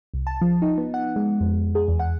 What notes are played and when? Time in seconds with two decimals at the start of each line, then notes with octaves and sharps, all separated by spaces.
0.14 C2
0.27 A5
0.42 F3
0.62 D#4
0.78 B3
0.94 F#5
1.16 G#3
1.40 F2
1.75 G#4
1.88 E2
2.00 F#5